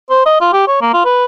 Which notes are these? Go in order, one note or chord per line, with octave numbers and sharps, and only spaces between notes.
C5
D#5
F4
G4
C#5
A#3
F4
B4